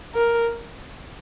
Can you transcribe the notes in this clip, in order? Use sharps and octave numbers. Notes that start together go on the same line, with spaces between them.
A#4